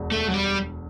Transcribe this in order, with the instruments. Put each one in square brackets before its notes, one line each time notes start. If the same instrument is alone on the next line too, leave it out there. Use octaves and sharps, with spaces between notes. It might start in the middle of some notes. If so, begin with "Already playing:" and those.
Already playing: [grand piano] E1 D2
[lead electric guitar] A3
F#3
G3